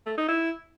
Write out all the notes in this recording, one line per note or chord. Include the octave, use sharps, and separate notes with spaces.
A3
D#4
E4